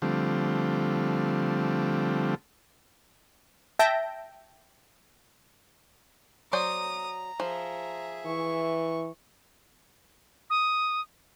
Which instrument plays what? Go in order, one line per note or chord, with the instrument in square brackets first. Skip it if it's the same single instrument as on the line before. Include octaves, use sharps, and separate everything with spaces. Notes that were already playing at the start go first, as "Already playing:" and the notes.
[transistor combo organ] D3 F3 G3 A3 C4
[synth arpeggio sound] E5 G5 A5 G6 A#6 D7
[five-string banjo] F#3 C5 D5 [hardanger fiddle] A#5 [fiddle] D#6
[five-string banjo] F3 [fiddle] G#4 E5
[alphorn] E3 [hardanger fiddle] C#6
[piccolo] D#6